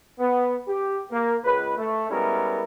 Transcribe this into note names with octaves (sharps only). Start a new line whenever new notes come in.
B3
G4
A#3
C#2 B4
A3
G3 G#3 B3 C#4 E4 A#4